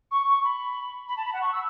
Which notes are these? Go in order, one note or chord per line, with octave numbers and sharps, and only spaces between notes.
C#6
C#6
B5
B5
A5
B5
F#5
C#6
E6